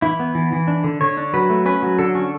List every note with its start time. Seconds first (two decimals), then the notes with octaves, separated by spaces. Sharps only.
0.02 E3 E4
0.20 B3
0.35 E3
0.52 E3
0.68 D4
0.84 D3
1.01 D3 C#5
1.17 D4
1.34 F#3 B4
1.50 A3
1.66 C#4 B4
1.82 F#3
1.99 D3 A4
2.15 C#4